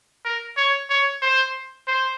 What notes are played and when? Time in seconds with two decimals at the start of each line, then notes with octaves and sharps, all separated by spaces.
0.25 A#4
0.57 C#5
0.90 C#5
1.22 C5
1.88 C5